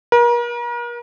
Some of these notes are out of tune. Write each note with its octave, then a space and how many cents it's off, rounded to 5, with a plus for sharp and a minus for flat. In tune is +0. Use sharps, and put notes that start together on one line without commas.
A#4 +40